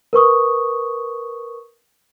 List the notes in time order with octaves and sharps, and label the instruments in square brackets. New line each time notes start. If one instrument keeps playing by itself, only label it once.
[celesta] A#4 B4 C#6 D#6